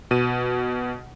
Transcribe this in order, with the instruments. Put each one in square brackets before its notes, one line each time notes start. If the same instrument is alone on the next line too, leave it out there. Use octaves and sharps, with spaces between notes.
[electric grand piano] B2 D#7